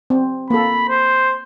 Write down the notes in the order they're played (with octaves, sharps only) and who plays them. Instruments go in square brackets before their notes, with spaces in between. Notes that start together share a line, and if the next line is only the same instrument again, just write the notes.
[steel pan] C4
[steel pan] A#3 A4 [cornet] B5
[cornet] C5